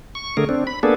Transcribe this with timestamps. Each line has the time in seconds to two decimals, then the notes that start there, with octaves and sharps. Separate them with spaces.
0.15 C#6
0.37 D3 A3 G#4 A#4
0.49 C4 D4
0.67 B5
0.83 A#3 B3 D4 G#4 A4